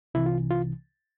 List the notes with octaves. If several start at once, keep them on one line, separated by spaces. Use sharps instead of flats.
C2 C3 E3 E4
F4
F4